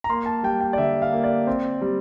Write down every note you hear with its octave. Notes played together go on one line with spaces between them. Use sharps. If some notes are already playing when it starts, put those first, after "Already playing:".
A#5
A#3 C6
A5
G3 G5
G5
D5
D3 E5
F5
A#3
D5
C4
G3